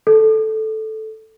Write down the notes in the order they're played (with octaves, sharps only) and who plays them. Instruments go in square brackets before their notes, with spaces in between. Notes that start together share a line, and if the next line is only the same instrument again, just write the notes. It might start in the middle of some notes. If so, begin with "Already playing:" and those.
[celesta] A4